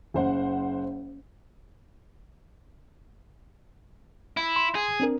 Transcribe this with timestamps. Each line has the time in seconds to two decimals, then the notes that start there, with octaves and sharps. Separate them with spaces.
0.14 F#1 C5 F#5
4.37 E4
4.56 C6
4.75 G#4
5.00 C4 D4 A#4